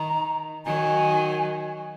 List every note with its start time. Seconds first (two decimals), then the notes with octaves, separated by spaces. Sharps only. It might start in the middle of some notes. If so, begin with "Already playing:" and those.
Already playing: D#3 A#5
0.65 D#3 F#3 G#5